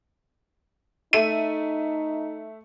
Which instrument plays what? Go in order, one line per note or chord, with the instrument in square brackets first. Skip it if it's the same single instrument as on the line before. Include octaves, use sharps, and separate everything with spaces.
[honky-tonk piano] A3 E5 D#7 [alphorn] D#4